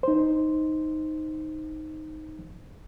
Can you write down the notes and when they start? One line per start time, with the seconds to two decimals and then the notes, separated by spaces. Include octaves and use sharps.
0.03 D#4 C5